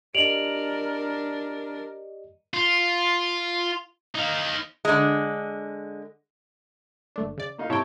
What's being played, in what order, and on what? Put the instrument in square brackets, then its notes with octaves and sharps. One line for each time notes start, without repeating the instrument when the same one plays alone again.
[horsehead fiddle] D4 A#4 [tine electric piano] G4 D5 D#5 [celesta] D7 F7 F#7
[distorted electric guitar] F4
D#4 F5
[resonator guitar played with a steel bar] D3 G#3
[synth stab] G1 A3 D4
C#3 D5
[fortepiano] A#3 D#4 F5
[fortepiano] C3 C#5 A5 [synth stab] E4 G5